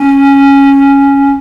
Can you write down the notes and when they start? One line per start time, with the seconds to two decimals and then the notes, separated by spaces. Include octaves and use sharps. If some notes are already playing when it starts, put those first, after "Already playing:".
Already playing: C#4